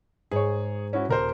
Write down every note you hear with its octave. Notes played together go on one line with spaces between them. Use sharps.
G#2 G#4 C#5
C#4 E4 F#4
D#1 A#4 C5